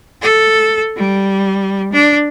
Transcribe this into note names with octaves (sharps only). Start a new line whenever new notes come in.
A4
G3
D4